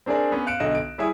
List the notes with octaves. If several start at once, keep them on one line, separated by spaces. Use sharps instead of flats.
C4 D4 G#4 A#4 D5
B3 C#4
F5 F#6 C#7 D7 E7
B1 D3 D#5 F#6 E7
D7
G3 E4 G#4 C#5 E5 D#6